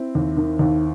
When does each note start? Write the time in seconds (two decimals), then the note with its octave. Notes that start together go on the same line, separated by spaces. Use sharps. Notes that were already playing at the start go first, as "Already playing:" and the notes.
Already playing: C4 E4
0.15 D#2
0.37 D#3
0.59 D#2